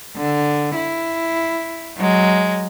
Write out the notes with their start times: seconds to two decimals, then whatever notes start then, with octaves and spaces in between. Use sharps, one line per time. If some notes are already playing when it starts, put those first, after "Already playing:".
0.16 D3
0.75 E4
1.97 F#3 G#3